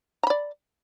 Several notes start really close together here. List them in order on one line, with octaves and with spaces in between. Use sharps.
A#5 B5 D5